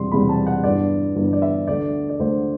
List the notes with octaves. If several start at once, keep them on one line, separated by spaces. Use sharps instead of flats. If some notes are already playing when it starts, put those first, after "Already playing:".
Already playing: E1 E2 C3 G3 C6
E1 E2 C3 G3 B5
A5
F#5
G1 G2 E3 B3 D5
G1 G2 E3 B3
D5
E5
D2 D3 A3 D5
D5
D2 D3 A3 C5